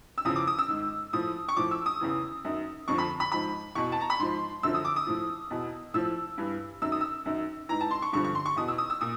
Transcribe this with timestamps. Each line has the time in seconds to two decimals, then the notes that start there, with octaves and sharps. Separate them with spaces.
0.18 E6
0.25 E2 C#3 F3 D#6
0.36 D6
0.47 D#6
0.59 E6
0.68 G#2 D#3
1.13 A2 F3 D#6
1.49 C#6
1.57 A2 F3 D6
1.71 E6
1.86 D#6
2.01 E2 C#3 E3
2.44 F#2 D#3
2.88 F2 D3 F3 C#6
2.98 B5
3.20 B5
3.32 G#2 F3 B5
3.75 E2 B2 C#6
3.92 A5
4.01 A#5
4.10 B5
4.19 G#2 F3 C6
4.63 F#2 D3 F3 E6
4.74 D#6
4.85 D6
4.96 D#6
5.07 A2 F3
5.50 E2 B2
5.94 A2 F3 E6
6.38 G2 E3
6.82 F#2 D#3 E6
6.92 D#6
7.01 E6
7.26 F#2 D#3
7.69 G#2 E3 A#5
7.81 A5
7.91 C6
8.02 C#6
8.13 G2 D3 F3 C#6
8.24 C#6
8.35 C6
8.46 C#6
8.56 E2 B2 D#6
8.68 E6
8.78 D#6
8.90 E6
9.01 A#2 D#6